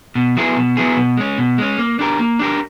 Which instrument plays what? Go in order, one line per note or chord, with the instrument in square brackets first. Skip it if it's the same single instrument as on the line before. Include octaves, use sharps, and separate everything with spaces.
[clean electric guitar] B2
F#3 B3 E4 G#4
B2
F#3 B3 E4 G#4
B2
G#3 C#4
B2
G#3 C#4
A#3
D4 G4 A#4
A#3
D4 G4 A#4